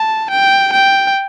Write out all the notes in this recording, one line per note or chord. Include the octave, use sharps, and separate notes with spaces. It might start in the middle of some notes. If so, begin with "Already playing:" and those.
Already playing: A5
G5
G5